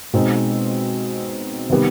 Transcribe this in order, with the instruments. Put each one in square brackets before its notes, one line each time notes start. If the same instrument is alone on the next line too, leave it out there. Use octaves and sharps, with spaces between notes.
[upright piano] B2 G#3 C4 D#4
C3 D#3 G3 B3